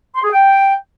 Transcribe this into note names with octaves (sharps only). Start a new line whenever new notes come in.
C6
G#4
G5